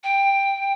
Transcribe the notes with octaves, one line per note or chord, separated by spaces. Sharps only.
G5